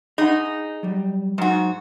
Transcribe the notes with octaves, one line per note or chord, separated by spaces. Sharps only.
D#4 G#4 F#5
F#3 G3
G#2 F#3 D#4 F#4